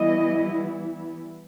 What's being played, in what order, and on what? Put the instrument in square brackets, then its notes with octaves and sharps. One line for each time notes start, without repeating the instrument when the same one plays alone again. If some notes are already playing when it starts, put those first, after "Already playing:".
Already playing: [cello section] E3 G3 B3 E4 D#5